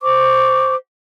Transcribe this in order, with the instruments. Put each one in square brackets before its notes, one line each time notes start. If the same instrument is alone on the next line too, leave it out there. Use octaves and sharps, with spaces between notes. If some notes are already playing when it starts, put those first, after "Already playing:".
[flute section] C5 C#6 D6